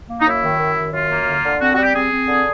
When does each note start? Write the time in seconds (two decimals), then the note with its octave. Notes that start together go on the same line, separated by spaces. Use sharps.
0.09 A#3
0.21 D#4
0.26 F#2 E4
0.43 D#3
0.60 F#2
0.77 D#3
0.93 F#2 F4
1.10 A#3
1.27 D3
1.44 D3
1.61 C4 F#4
1.72 F#4
1.78 G3 G4
1.94 C4 G#4
2.11 C4
2.28 D3